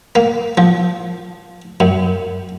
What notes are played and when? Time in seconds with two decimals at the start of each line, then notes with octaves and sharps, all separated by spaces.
0.16 A#3
0.58 F3
1.80 F#2